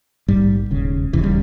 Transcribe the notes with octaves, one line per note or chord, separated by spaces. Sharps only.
A#1 G#2 G3
E1 D#2 C#3
E1 D#2 C#3 E3
G3